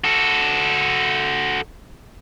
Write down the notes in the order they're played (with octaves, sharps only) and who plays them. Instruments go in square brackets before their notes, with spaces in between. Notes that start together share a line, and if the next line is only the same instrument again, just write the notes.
[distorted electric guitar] F#4 A4